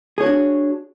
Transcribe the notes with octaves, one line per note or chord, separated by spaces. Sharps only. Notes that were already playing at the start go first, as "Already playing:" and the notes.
D4 F#4 G#4 C#5